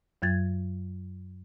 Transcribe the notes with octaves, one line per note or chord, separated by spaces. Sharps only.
F#2 F#3 G#6 A6